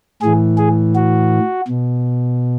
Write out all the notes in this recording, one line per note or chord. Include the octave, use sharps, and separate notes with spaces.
A2 E3 G#4
G#4
F#4
B2